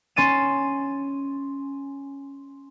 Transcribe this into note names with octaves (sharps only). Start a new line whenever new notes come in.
C#4 C6 A6 D#7 E7